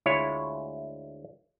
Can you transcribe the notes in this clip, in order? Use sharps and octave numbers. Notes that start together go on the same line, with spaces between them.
D2 G#3 E4 F4 C#5